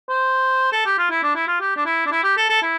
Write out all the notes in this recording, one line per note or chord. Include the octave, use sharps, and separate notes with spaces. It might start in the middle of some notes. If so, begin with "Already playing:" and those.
C5
A4
G4
F4
E4
D4
E4
F4
G4
D4
E4
D4
E4
G4
A4
A4
E4